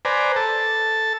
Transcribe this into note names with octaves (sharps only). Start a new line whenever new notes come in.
B4 C5 D5 G#5 A#5
A4 A5